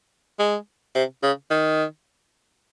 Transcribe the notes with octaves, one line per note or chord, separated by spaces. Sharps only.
G#3
C3
C#3
D#3